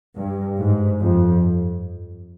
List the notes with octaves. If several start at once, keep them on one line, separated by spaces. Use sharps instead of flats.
G2
G#2
F2